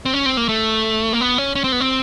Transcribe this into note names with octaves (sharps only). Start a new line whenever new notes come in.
C4
C#4
C4
A#3
A3
A#3
B3
C#4
C#4
C4
B3
C4